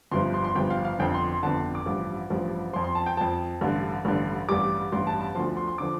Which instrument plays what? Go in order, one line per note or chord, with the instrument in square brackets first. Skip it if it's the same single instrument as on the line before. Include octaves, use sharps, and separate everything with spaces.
[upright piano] G1 G2 F3 C6
C6
C6
G1 G2 F3 G5
F5
F5
G1 F2 D3 G5
C6
C6
G1 F2 D3 A5
D6
A1 G2 F3
A1 G2 F3
F3 C6
F2
C6
A5
G5
F2 F3 A5
A1 G2 D3
A1 G2 D3
A1 G2 G3 D6
A1 G2 G3 C6
A5
A5
D2 D3 F3 C6
C6
C6
D3 F3 D6